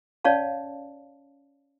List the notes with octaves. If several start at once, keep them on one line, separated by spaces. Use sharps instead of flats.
C#4 C#5 D5 F5 A5